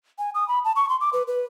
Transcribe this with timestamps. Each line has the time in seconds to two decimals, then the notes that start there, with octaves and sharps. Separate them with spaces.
0.19 G#5
0.35 D#6
0.48 B5
0.65 A5
0.76 C#6
0.89 C6
1.01 D6
1.13 B4
1.27 B4